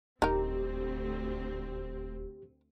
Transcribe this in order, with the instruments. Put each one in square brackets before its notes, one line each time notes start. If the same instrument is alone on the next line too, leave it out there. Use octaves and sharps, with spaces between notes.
[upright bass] D#1 [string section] D2 C4 [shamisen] D#4 A#4 [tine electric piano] G4